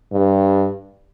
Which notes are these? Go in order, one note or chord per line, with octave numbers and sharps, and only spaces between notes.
G2